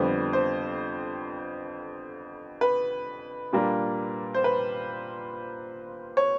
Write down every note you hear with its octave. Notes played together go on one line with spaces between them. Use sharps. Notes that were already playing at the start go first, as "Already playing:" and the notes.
Already playing: F2 D3 G3 B3 C5
C5
B4
A#2 G3 A#3 D4
C5
B4
C#5